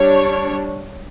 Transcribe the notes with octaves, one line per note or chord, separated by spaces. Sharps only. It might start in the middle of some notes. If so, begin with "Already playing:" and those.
Already playing: G3 D4 C#5